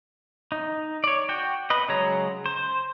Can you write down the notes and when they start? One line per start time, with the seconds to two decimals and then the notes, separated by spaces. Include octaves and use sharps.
0.52 D#4
1.04 C#5 D5
1.29 F#4 G5
1.70 B4 D#5
1.89 C#3 F#3 G#3 C#5 A#5
2.46 C5